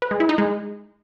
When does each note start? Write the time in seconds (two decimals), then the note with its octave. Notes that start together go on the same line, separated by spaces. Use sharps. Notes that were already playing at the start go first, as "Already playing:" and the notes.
0.02 B4
0.11 G#3
0.20 E4
0.29 D#4
0.38 G#3